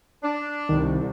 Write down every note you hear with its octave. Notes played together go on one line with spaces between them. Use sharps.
D4
C2 D#3